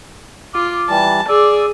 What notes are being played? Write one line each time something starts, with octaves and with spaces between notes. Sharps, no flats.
F4 D6
E3 G3 A5
G#4 D5 D6 E6